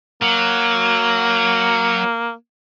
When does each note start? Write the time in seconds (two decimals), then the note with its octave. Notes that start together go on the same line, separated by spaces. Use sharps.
0.22 F#3 A#3